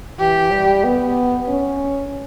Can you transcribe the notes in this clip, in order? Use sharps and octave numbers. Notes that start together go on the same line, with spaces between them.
E3 G4
G3
B3
C#4